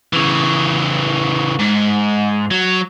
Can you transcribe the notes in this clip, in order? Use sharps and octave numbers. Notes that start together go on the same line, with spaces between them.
C#3 E3
G#2
F#3